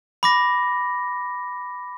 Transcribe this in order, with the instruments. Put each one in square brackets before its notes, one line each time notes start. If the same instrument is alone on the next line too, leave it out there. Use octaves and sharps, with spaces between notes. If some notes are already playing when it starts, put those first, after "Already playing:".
[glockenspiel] B5 D6 A#6